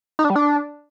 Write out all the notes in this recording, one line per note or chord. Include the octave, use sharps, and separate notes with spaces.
D#4
D4
G3
D4